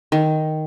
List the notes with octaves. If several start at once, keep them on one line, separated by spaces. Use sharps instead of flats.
D#3